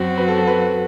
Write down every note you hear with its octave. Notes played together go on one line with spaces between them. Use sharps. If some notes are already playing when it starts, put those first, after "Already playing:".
Already playing: F#2 F#3 C4 F#4
B4
A4
A4
B4